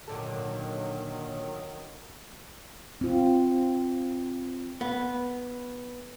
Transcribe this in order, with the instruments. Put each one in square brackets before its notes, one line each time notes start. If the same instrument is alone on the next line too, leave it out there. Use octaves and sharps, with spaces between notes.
[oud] A#2 D3 A4 [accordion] D#3 F#3
[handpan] C4 F4
[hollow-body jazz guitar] B3